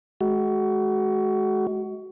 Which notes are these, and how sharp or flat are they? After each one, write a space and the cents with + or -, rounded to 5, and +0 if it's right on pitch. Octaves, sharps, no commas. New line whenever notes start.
G#3 +35 F#4 +20